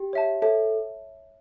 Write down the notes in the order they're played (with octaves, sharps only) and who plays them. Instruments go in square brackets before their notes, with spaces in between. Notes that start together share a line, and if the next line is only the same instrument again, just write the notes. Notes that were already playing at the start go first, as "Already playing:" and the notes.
Already playing: [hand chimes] G4
[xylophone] C#5 E5 A5
[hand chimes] A4 [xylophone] C#5 E5 A5